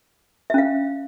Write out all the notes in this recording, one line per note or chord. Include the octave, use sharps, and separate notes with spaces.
C#4 E5 F5